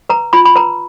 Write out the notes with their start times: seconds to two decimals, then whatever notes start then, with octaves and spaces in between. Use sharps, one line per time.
0.09 B4 A#5
0.33 F4 B5
0.45 B5
0.55 B4 A#5